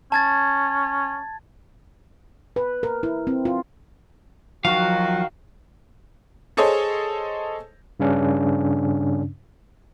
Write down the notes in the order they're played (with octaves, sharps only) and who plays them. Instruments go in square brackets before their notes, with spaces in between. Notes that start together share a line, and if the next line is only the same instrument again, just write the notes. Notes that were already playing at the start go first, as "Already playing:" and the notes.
[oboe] C#4 [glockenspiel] A5 G#6 A6
[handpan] B4
A#4
E4
C4
F4
[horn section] D#3 F#4 [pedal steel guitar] F3 F#3 F4 [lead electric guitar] F5
[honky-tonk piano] G#4 A4 C5 C#5 D#5
[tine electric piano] G2 C#3 C#4 D4